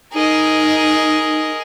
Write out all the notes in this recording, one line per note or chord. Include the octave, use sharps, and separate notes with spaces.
D#4 G#4 A#4 D#5